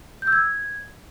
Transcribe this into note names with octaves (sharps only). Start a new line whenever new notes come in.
G6
E6
G#6